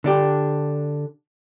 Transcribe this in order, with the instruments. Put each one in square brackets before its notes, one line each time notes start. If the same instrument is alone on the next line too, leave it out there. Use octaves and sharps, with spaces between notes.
[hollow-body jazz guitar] D3 D4 G4